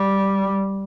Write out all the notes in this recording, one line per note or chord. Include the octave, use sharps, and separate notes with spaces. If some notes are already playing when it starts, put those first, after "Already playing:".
Already playing: G3